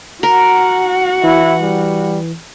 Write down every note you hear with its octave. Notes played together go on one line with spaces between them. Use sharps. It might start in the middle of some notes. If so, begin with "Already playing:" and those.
F#4 A#4 F#5
E3 E4
G3